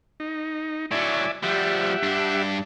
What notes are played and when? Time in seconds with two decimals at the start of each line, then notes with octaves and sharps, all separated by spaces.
0.20 D#4
0.91 A2 F#3 D5 E5 G#5
1.44 F3 G3 G4 E5 F#5
2.03 G2 D4